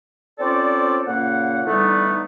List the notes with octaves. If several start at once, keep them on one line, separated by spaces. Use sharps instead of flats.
C4 C#4 F4 A4 C5 D5
A#2 C#3 A#3 F#5
D3 E3 G3 A3 B3 D#4